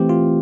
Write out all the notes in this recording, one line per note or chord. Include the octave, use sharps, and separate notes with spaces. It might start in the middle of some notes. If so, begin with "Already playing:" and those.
Already playing: E3 A3 C4 G4
F4